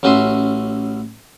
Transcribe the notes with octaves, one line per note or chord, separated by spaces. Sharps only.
A1 C#4 F#4 D#5 E5 C6